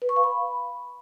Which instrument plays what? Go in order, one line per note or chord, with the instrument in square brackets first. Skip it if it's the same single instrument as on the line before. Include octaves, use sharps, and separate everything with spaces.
[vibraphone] B4
C#6
F5
B5